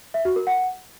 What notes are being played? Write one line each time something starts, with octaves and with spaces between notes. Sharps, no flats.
E5
F#4
A#4
F#5